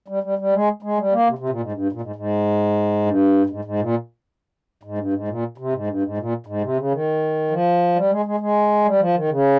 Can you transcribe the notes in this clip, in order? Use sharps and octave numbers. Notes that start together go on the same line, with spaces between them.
G3
G3
G3
G#3
G#3
G3
A#3
C3
C3
A#2
G#2
G2
A#2
G#2
G#2
G2
G2
G#2
G#2
A#2
G#2
G2
G#2
A#2
C3
G#2
G2
G#2
A#2
G#2
C3
C#3
D#3
F3
G3
G#3
G#3
G#3
G3
F3
D#3
C#3